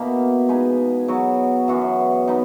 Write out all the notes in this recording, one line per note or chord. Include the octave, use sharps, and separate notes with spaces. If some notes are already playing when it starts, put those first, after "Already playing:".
Already playing: B2 A#3 E4
G#3 D#4 G#4 B4
F#3 B3 F#4
F#2 E3 B3 F#4
B3 D#4